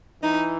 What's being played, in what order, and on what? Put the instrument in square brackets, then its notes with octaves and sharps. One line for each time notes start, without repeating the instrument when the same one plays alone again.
[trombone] E3 [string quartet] D#4